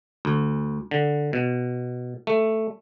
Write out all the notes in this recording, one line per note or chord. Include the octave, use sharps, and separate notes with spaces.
D2
D3
B2
A3